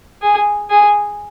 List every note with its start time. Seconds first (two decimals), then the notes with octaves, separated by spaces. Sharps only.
0.22 G#4
0.70 G#4